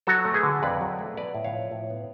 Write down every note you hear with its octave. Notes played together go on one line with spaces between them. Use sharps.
F#3 F#4 A4
A3
G#4 B4
D3
F2 B4 D5
F#3
A3
B3 B4 D5
A2
C#5 F5
F3
A2
B3